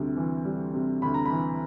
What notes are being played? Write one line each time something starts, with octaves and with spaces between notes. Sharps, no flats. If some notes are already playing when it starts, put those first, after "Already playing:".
Already playing: D2 C3 G3
E3
G3
C3
D2 B5
A#5
E3 B5